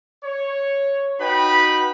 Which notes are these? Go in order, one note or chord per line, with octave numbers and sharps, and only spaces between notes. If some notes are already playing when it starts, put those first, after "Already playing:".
C#5
D#4 F#4 B4 G5 B5